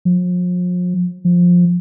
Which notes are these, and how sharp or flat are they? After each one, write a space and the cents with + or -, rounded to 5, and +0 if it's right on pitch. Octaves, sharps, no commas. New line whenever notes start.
F3 +40
F3 +15